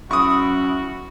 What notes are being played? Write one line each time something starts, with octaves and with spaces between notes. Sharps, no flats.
F#3 C#4 E4 F#4 C#6 D#6